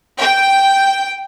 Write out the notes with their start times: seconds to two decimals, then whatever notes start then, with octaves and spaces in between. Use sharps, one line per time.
0.19 G5